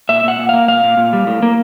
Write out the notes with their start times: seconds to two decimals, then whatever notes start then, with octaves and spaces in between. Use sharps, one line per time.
0.09 A#2 E5
0.24 A#2 F#5
0.39 A#2
0.49 A#3 F5
0.68 A#2 F5
0.84 A#2
0.97 A#2
1.13 G3
1.27 A2
1.42 A#3